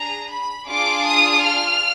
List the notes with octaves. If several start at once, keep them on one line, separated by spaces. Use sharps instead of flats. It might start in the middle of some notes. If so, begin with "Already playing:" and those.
Already playing: D4 G#4 A#5
B5
D4 F4 G#4 D6
D#6
F6